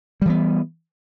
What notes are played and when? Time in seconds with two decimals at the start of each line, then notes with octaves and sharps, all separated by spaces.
0.22 G3
0.26 E3
0.30 B3